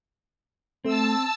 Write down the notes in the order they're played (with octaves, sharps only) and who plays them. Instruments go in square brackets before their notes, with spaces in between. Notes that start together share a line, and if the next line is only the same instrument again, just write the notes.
[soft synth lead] A3 [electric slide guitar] C4 [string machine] A5 E6